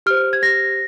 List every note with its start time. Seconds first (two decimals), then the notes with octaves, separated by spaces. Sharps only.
0.06 G4 C5 F6
0.33 G#6
0.43 G4 C5 A#6